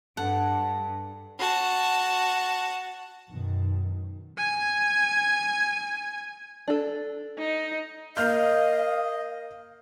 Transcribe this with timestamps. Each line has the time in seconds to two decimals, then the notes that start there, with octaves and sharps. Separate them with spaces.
0.17 G2 A4 F#5
1.39 F#4 A5
3.31 F#2 B2 D#3
4.38 G#5 G#6
6.68 D4 A4
7.38 D#4
8.17 A#3 D#5 F5 F6 G6